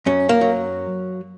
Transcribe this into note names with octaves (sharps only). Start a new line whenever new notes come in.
F#2 C#4
A#3
F#3